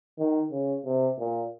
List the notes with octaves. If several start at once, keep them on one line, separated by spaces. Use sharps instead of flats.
D#3
C#3
C3
A#2